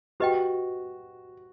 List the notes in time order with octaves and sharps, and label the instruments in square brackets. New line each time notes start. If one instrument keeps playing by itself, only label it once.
[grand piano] F#4 [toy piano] G4 B4 D#5 G5